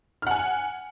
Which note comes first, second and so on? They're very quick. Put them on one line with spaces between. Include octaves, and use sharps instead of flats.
F6 F#5 G#5